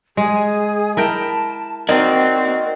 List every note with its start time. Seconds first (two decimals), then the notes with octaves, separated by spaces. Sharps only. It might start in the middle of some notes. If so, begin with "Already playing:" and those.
0.17 G#3 G#4
0.97 E4 A#4 G5 A5
1.89 C4 D#4 F#4 A#4 D5 D#5